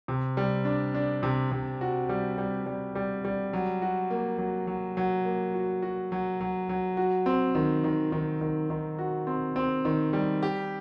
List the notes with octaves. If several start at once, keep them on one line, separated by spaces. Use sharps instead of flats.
C3
G3
D4
D4
C3
C3
F#4
G3
G3
G3
G3
G3
F#3
F#4
A#3
F#3
F#3
F#3
A#3
F#4
F#4
F#3
F#3
F#3
F#4
C4
D#3
D#3
D#3
D#3
D#3
F#4
C4
C4
D#3
G3
G4